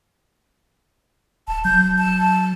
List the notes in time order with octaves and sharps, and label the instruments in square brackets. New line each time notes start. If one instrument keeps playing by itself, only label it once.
[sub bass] D1 [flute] A5
[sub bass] F#3 [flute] G6
[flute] A5